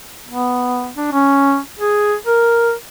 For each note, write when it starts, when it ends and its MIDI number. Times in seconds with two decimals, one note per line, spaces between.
0.29 0.90 59
0.97 1.09 62
1.12 1.58 61
1.79 2.15 68
2.26 2.72 70